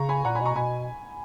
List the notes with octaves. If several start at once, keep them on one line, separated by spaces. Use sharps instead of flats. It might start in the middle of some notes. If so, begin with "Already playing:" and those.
Already playing: C#3 A#5 C#6
G#5 B5
A#2 F#5 A#5
G#5 B5
B2
A#5 C#6
B2 G#5 B5